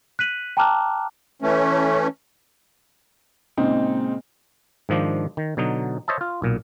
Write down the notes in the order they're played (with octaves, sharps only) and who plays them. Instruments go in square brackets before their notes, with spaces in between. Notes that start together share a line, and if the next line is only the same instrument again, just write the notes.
[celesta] F#6 B6 D#7 F#7
G5 A5 A#5 D6 F6 F#6
[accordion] E3 A3 C#4
[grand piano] A#2 C#3 G#3 C4 D#4
[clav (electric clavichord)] G#2 D#3 F3 D4
D#3
B2 D3 F#3 D#4
C5 C#5 D#5 E5 A5
F4
B1 A#2